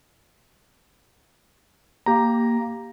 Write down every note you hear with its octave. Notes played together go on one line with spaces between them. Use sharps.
A#3 G4 A#5